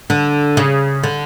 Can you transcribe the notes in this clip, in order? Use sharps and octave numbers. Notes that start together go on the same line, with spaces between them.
D3
C#3
D3